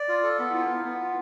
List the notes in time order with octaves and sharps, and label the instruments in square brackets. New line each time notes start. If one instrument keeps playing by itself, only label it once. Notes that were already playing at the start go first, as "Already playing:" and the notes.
Already playing: [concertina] D5
F4
A4
[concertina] B3 [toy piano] F4
[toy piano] E4 [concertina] F4
[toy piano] D4
[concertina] B3 [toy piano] E4
[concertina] B3
F4